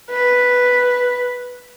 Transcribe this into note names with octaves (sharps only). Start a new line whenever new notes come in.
B4